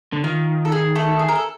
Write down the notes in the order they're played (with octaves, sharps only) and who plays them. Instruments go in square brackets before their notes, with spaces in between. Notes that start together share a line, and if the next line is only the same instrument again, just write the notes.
[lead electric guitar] D3
[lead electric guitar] D#3 [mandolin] F4
[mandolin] A4
G#4
A3 A4
G#4
A#4
A4